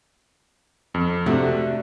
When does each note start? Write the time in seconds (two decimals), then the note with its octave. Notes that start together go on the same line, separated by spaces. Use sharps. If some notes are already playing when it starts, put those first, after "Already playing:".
0.94 F2
1.26 C3 A3 D4 F#4